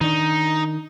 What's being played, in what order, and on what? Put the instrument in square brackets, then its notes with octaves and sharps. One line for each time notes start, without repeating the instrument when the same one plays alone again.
[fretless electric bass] D#3 D4 [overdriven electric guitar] D#4